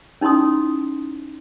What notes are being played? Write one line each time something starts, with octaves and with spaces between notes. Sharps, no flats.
C#4 D#4 E4 C6 D#6